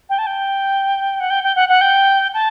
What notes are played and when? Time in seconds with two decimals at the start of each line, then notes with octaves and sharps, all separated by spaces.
0.09 G5
0.18 A5
0.26 G5
1.20 F#5
1.30 G5
1.44 G5
1.56 F#5
1.69 F#5
1.81 G5
2.34 A5